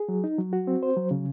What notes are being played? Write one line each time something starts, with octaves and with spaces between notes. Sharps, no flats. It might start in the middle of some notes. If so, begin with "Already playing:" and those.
Already playing: G#4
F#3
D#4
F#3
F#4
C4
C5
F#3
C#3